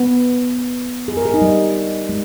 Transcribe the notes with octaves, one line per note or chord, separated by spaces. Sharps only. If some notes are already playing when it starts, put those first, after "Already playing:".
Already playing: B3
G#4
A#4
G#4
D#4
G3
G#3